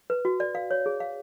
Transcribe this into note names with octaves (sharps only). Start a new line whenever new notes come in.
B4
F#4
D5
F5
C#5
G#4
F5